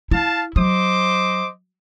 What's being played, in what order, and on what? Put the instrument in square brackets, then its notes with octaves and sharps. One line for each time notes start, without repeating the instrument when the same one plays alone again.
[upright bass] E4 [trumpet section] F5 A5
[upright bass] F#3 [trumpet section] C5 D#5 D6